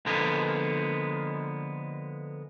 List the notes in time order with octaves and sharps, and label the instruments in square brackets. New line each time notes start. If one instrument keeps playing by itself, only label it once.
[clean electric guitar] D3 F3 G#3 A#3 B3